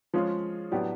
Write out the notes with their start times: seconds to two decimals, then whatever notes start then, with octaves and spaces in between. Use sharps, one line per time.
0.14 F3 G#3 C#4 F4 G#4
0.72 A2 F#3 B3 D4 G4